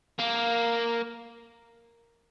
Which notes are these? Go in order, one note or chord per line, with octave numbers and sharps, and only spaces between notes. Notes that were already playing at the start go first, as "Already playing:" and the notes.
A#3